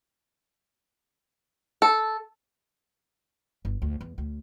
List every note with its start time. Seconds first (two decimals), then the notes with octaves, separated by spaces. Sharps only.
1.82 A4
3.65 G1
3.82 D2
4.01 E2
4.18 D2